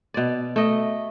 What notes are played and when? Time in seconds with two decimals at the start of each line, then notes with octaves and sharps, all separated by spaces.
0.14 B2 D5
0.56 A3 D#5